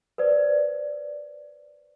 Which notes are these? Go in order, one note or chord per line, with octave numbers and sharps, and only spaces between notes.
B4 C5 D5